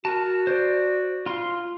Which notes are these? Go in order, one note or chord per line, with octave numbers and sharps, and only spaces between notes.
F#4 A#4 A5
C5 D5
F4 C6